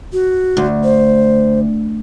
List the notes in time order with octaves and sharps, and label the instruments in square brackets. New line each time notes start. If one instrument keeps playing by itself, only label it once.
[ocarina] F#4
[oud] D2
[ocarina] C5